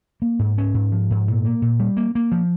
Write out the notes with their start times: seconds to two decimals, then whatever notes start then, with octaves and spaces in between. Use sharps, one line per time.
0.22 A#3
0.39 G#2
0.58 C#4
0.74 G#2
0.92 F3
1.10 G#2
1.28 A#2
1.45 A#3
1.62 A#2
1.80 G3
1.97 A#3
2.15 A#3
2.32 F3